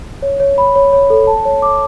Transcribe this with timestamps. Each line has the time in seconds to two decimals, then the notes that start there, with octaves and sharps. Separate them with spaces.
0.22 C#5
0.40 C#5
0.58 B5
0.76 C#5
0.93 C#5
1.10 A4
1.27 A5
1.45 C#5
1.62 D6